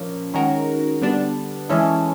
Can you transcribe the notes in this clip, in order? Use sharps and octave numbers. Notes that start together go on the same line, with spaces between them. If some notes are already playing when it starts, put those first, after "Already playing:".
Already playing: A#2 F3 A#3 C#4
D#3 G#3 C#4 F#4 A#4
D3 G3 B3 D4
E3 G#3 C#4 E4 A4